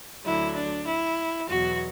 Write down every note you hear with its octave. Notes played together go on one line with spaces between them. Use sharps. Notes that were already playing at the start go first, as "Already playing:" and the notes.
D2 D3 F#3 E4
D4
E4
E2 B2 F#3 F#4